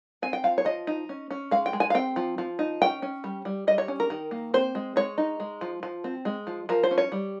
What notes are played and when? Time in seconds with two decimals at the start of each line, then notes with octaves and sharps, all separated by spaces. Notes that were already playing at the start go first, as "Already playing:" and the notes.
0.22 C4 G#5
0.33 G5
0.44 F3 F5
0.58 C#5
0.65 F3 D#5
0.87 D#4
1.09 C#4
1.31 C#4
1.51 G#3 F5
1.66 G5
1.73 G#3
1.80 G#5
1.90 F5
1.95 C4 G5
2.16 F3
2.38 F3
2.59 D#4
2.82 C#4 G5
3.02 C#4
3.24 G3
3.45 G3
3.67 G3 D#5
3.78 C#5
3.88 C#4
4.00 A#4
4.10 D#3
4.31 A#3
4.54 C4 C5
4.75 G#3
4.96 G#3 C#5
5.18 D#4
5.40 G#3
5.61 F3
5.83 F3
6.04 C4
6.25 G#3
6.47 F3
6.69 F3 A#4
6.83 C5
6.91 C#4
6.98 C#5
7.12 G3